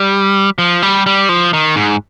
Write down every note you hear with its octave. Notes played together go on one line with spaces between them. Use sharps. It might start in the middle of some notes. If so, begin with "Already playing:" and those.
Already playing: G3
F3
G3
G3
F3
D#3
G#2